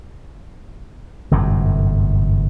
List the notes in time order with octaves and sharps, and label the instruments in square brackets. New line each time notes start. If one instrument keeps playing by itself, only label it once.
[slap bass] G1 F#2 A2 C3